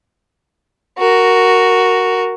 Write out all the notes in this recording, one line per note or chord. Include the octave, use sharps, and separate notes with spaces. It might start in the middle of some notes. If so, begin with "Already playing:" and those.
F#4 A#4